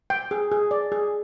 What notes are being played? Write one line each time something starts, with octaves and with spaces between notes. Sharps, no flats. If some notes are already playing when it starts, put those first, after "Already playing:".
G5
G#4
G#4
D5
G#4